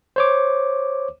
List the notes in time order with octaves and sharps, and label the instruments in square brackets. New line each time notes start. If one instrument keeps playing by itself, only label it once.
[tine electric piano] C5 C#5 D6